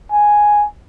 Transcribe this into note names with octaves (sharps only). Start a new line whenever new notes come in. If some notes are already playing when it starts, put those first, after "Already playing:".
G#5